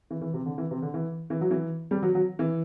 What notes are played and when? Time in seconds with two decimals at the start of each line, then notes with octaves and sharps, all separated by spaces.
0.11 E3
0.21 E3
0.34 C3
0.46 D3
0.58 E3
0.71 C3
0.82 D3
0.94 E3
1.30 E3
1.41 F#3
1.51 E3
1.91 G3
2.03 F#3
2.15 F#3
2.39 E3